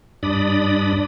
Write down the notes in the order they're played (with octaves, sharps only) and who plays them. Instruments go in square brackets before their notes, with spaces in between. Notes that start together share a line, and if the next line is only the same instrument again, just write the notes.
[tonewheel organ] G2 D4 D5 B5 D#6